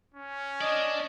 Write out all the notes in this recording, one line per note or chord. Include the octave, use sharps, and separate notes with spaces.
C#4
D4 D5 D#5